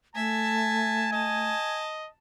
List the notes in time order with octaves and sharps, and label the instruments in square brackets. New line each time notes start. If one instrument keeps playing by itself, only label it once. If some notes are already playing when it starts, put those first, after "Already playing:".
[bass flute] A3 [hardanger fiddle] E5 [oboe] G#5 [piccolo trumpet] A5
[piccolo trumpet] D#5 [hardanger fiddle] A5